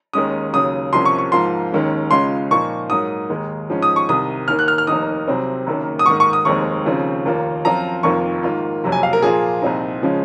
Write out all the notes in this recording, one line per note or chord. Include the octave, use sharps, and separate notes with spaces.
D#2 D#3 G#3 C#4 D#6
D#2 C#3 F#3 D#6
C2 C3 F3 A#3 C#4 C6
C#6
C#6
G#2 F3 A#3 F4 C6
D#2 D#3 G#3 C#4
C#2 C#3 G#3 C#4 F4 C6
A#2 F3 A#3 D#4 C#6
G#2 F#3 A#3 D#6
D#2 D#3 G#3
G#2 F3 G#3 C#4
D#6
C#6
C2 C3 D#3 D#6
D#2 D#3 A#3 F6
F#6
F6
F6
F1 D#2 D#3 A#3 D#4 D#6
C2 C3 F#3 C4
F#1 F#2 D#3 A#3
D#6
G#2 D#3 A#3 C#6
C#6
D#6
F1 D#2 D#3 G#3 C4 C#6
D#2 C#3 F3 C4
F1 D#2 D#3 A#3 F4
F#2 F3 C4 F4 A#5
F1 F2 D#3 A#3 F4 C#6
G#2 D#3 A#3 F4
F#1 F2 C3 F#3
G#5
F5
A#4
A#2 F3 A#3 F4 G#4
C2 A#2 F3 C4 D#4
C#3 F3 G#3 C#4